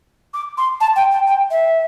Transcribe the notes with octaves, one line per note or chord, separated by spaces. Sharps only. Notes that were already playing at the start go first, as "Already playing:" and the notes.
D6
C6
A5
G5
G5
G5
E5